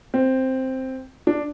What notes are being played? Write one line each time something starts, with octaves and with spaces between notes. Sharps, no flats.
C4
D4